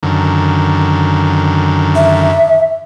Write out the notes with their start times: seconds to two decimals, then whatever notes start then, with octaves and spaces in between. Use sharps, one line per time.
0.03 F#2 D3 D#3
1.95 E5